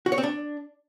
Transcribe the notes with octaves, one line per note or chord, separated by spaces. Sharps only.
F#4
C#5
C4
D4